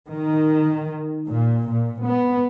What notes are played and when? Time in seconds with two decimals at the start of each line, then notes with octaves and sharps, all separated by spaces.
0.11 D#3
1.30 A#2
1.70 A#2
2.05 B3